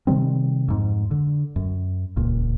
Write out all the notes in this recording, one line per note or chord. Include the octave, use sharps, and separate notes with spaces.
C3 D#3 G3 C4
F2 G#2
D3
F#2
D#1 C#2 A#2